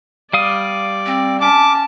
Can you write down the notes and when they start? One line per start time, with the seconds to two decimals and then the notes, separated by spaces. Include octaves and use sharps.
0.33 G3 D5 F5 D#6
1.06 C4
1.41 C#4 A5 D6